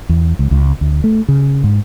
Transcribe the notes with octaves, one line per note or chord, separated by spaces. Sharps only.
E2
C#2
C#2
D2
A3
C#3
G#2